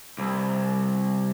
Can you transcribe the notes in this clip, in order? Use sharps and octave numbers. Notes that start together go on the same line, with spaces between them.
C2